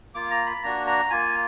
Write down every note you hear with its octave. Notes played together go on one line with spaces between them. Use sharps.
A#3 F4 D6
A#5
B5
A#3 D4 F#4 A#5
A#5
A#3 F4 G#5